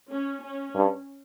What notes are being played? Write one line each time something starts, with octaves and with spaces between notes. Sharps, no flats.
C#4
C#4
G2